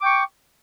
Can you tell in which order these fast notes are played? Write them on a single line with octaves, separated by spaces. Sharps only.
D6 G5 C#6